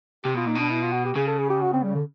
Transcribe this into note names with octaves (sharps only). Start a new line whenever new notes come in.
C3 G4
B2 F4
A#2 D#4
B2 D4
E4
F4
F#4
G4
C#3 G#4
A4
G#4
G4
F#4
C4
G3
D3